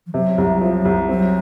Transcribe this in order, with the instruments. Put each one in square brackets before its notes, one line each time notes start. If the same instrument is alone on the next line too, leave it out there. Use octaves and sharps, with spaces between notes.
[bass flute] F3
[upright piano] C3 [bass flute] F#3
[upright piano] C2
F3
C2
[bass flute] F#3 [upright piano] C4